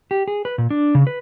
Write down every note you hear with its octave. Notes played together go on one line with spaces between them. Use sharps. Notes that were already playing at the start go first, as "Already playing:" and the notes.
G4
G#4
B4
A#2
D4
C#3
B4